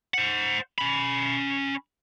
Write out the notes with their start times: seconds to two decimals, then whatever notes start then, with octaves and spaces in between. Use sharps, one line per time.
0.14 C5 F#5
0.78 C#4 B5